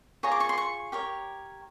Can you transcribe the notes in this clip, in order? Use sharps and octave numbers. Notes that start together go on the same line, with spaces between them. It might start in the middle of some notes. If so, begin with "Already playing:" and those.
F4 G#4 C#5 A#5
D6
C#6
C6
C#6
G4 A#4 C#5